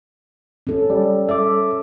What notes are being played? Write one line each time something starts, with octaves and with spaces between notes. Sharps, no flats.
C#4 A4
G3
A4 E5 D6